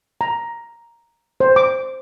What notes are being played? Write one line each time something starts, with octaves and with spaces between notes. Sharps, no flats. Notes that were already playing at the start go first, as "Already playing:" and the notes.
A#5
C5
D6